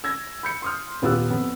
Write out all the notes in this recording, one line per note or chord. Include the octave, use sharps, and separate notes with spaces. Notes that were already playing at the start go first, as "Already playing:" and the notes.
E6 G#6 A#6
B5 G6 C#7
C6 D#6 F6
D#1 B3 F4 G4 E6 F#6
F2 B3